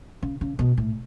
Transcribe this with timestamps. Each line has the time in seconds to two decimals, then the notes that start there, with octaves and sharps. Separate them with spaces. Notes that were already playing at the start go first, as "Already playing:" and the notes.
0.22 C#3
0.41 C#3
0.59 B2
0.77 A2